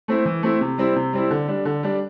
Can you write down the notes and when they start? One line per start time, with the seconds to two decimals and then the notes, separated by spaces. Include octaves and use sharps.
0.08 A3 C4 E4
0.25 E3
0.43 A3 C4 E4
0.61 C3
0.78 G3 C4 E4
0.96 C3
1.13 G3 C4 E4
1.31 D3
1.48 G3 D4
1.65 D3
1.83 G3 D4